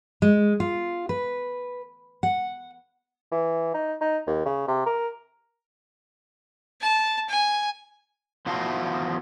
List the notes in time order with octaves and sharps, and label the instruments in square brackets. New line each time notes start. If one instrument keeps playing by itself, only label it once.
[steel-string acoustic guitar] G#3
F4
B4
F#5
[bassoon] E3
D#4
D#4
D#2
C#3
C3
A#4
[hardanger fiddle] A5
G#5
[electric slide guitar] E2 F3 E4 F#4 F5 A5